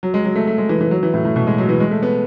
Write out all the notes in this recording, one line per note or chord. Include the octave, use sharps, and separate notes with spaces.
F#3
G#3
F#3
A3
A3
G#3
E3
E3
F#3
E3
A2
A2
B2
G#3
F#3
E3
G#3
A3
B3